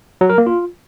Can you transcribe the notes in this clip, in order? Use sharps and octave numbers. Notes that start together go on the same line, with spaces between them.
F#3
A#4
A#3
F4